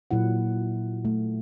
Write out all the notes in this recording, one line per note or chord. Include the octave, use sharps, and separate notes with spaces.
A#2 F#3 E4 F#5
A3